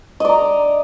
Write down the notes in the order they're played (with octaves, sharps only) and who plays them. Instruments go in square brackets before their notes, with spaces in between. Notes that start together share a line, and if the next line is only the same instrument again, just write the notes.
[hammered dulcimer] D#5
D5
A#5